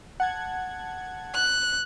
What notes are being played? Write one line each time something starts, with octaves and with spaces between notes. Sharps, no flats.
F#5 A5 G#6
F#6